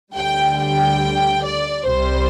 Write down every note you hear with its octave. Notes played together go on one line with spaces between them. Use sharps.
D2 D3 G3 G5
G5
D5
C2 C3 G3 C5